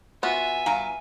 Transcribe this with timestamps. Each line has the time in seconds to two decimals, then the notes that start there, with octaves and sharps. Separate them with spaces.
0.23 B3 F4 F#4 E5 G#5
0.66 G2 F5 A#5